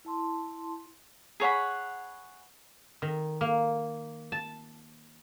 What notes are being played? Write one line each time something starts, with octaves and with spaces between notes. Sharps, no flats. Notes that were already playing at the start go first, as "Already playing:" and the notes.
E4 A5 C6
G#4 C#5 F#5 B5
D#3
A#3
A5